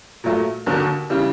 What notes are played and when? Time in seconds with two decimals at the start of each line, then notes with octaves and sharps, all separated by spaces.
0.24 A#2 F#3 A3
0.66 D#2 D3 F#3
1.10 C#3 E3 G3